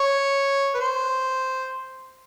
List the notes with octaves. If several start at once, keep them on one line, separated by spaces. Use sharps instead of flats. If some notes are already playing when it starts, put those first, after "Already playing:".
Already playing: C#5
B4
C5